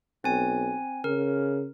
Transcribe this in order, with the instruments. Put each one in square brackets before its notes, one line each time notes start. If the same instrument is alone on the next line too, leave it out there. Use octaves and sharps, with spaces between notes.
[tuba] B1 [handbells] C4 G#5
[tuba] C#3 [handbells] A#4